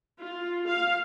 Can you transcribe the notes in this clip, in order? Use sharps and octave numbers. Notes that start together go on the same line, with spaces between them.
F4
F5